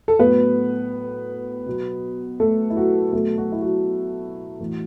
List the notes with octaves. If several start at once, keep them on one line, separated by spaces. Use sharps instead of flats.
A4
A2 F#3 B3 B4
B2 F#3
A3 A4
E4
F#3 F#4
B2 F#3 A3 A4
F#3 F#4
E4
F#3 F#4
A2 E3